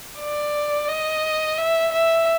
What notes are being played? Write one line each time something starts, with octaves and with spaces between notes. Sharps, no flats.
D5
D#5
E5
E5